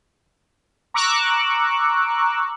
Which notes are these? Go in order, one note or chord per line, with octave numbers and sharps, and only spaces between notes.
A#5 C#6 D6 E6 F#6